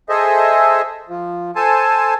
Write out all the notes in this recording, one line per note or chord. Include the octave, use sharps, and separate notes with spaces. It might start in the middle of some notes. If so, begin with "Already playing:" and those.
G#4 A4 C5 D#5 E5
F3
A4 C5 G#5 A5